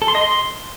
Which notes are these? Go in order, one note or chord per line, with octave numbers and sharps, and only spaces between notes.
A4
C6
D#5
C6